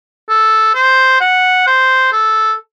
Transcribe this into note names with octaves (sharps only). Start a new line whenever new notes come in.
A4
C5
F#5
C5
A4